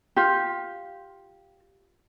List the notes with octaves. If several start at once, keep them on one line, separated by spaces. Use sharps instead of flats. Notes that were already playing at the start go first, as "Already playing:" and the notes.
F4 G4